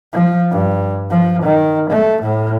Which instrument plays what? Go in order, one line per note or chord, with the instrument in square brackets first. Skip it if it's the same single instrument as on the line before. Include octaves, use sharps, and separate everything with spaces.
[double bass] F3
G2
F3
D#3
A3
A2